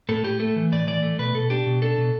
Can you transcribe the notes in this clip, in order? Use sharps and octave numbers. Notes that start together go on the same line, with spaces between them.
A2 A4
A2 G4
A3 A4
E3
A2 D5
E3 D5
A3
B2 B4
B2 A4
D4 G4
B2
D4 A4
B2